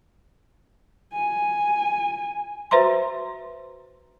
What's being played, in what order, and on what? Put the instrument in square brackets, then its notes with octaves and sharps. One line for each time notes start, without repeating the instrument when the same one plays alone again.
[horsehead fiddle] G#5
[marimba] F#4 B4 C5 E5 A#5 C6